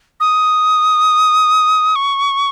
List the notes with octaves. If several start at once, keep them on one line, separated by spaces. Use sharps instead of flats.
D#6
C#6